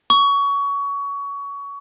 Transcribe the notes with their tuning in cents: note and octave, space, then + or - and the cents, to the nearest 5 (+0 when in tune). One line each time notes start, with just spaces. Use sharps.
C#6 +25